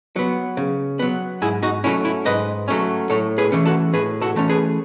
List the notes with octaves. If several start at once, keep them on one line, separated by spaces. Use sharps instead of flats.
F#3 B3
C#3
F#3 B3
G#2 E4 G#4
D#4 F#4
F#3 A3 C#4 E4
E4
G#2 B4 D#5
F#3 A3 C#4
A2 A4 C#5
G#4 B4
E3 A3 C#4
F#4 A4
A2 G#4 B4
F#4 A4
E3 A3 C#4
G#4 B4